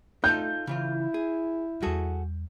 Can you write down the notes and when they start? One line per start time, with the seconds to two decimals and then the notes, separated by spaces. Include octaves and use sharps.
0.24 A3 D#4 F4 A4 G6
0.67 C#3 E3 E4 F4
1.14 G#4
1.83 E2 G3 F#4 G#4 A4